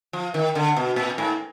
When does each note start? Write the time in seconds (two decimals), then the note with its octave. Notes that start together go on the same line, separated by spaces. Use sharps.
0.13 F3
0.34 D#3
0.55 D3
0.77 B2
0.96 A#2
1.18 G#2